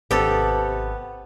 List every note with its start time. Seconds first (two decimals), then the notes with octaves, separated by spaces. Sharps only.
0.11 G#1 C3 B3 G4 A4